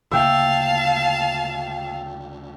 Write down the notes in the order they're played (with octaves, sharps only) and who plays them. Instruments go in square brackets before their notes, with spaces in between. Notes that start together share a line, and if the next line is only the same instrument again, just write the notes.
[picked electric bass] D2 C#3 A#3 [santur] E5 G5 [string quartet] F5 A5